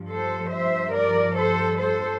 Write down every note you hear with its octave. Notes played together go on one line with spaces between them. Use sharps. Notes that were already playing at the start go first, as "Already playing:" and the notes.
Already playing: G2 F3
A4 C5
C5 E5
A#4 D5
A4 C5
A4 C5